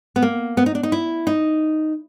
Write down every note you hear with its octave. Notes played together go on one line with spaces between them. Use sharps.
B3
A#3
B3
D#4
D4
D#4
E4
D#4